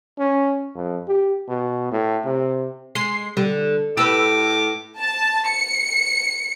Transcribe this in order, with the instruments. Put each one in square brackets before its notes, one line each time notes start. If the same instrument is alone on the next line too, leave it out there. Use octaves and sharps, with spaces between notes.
[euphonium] C#4
F2
G4
B2
A2
C3
[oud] G#3 [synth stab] C6 C7
[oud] D3 [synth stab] G3
[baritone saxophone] A2 [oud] G4 B4 [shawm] D6 [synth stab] E6
[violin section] A5
C#7